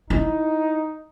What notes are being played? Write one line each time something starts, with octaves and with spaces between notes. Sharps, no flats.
D#4 E4